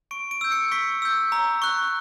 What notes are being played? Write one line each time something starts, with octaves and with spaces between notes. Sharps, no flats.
C#6 D7
D7
E6 G6
C#7
C#6 B6
E6 G6
A#5
C#6 F#6